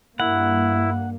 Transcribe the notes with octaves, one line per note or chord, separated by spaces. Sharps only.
G2 A#3 E4 F#5